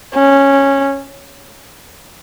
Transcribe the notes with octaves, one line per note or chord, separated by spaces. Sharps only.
C#4